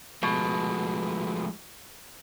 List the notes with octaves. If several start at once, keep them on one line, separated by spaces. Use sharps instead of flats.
B2 F3 G#3 A3